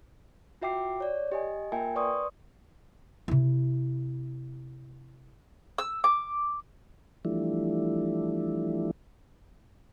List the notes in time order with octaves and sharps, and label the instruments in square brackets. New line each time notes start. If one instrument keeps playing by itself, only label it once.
[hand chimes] F4 F#4 E5 G5 D6 C7
C#5 D5
G4 D#5 G#5
A#3 F4 A#4 E5 G5 G#5
B4 D5 C6 C#6 D#6
[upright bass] C3 E4
[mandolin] E6
D6
[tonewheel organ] E3 F3 G3 A3 D4 E4